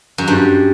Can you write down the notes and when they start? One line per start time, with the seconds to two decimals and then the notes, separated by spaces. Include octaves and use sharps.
0.18 F#2
0.28 G2